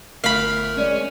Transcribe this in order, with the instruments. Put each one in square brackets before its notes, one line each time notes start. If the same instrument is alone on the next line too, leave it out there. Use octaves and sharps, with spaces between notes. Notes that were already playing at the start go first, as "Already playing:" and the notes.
[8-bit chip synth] G1 A3 A#4 [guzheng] F5 B5
[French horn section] G#3 D5 [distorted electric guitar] C#4